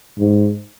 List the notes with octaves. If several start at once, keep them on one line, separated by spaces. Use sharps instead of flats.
G#2